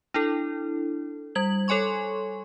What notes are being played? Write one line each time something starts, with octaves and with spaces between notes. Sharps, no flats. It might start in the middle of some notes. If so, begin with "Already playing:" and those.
D4 E4 A4
G3 G#6 F#7
A4 C#5 G#5 C6 C#6